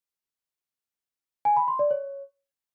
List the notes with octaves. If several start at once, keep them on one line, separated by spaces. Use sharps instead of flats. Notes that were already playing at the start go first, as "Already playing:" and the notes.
G#5
B5
C6
D5
C#5